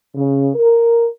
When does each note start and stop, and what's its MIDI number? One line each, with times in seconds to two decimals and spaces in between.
0.15 0.50 49
0.54 1.07 70